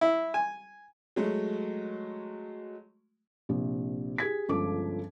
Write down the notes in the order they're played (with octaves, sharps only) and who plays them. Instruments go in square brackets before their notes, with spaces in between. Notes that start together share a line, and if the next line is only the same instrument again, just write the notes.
[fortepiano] E4
G#5
[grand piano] F#3 G#3 A3
[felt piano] A#1 C3
G4 G#4 G#6 B6
G1 C#2 F3 A4 D6